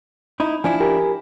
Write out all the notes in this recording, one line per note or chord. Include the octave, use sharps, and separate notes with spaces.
D#4 E4
F3 D4 E4 G#5
G4 A#4 G#5